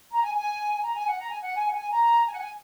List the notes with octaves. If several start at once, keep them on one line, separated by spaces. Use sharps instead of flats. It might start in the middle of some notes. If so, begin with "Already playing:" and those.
A#5
G#5
G#5
A#5
G#5
F#5
A#5
G#5
F#5
G#5
F#5
G#5
A#5
G#5
F#5
G#5